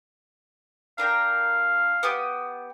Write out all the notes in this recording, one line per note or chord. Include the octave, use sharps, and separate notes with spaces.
D4 A#4 F5 G5
B3 G4 D#6